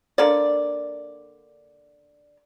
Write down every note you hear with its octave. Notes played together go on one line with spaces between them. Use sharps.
D3 A#3 D5